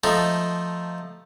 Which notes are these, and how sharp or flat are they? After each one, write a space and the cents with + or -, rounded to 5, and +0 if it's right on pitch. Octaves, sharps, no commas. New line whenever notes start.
F3 +0 A3 +0 D#4 +0